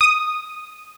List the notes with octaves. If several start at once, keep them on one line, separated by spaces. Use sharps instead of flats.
D#6